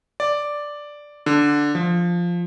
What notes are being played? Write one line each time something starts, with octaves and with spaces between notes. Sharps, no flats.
D5
D3
F3